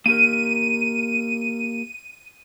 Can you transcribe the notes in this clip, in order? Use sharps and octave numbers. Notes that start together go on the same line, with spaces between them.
A#3 G4 A#4 D#7